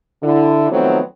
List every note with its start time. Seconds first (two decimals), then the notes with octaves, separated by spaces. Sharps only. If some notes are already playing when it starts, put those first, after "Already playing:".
0.23 D3 E4
0.71 D#3 F3 F#3 A3 B3 C4